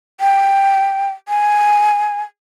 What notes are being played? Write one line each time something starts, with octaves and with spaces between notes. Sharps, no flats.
G5
G#5